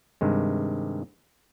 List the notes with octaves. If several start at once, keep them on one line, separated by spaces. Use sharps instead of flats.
G2 C3 D#3 G#3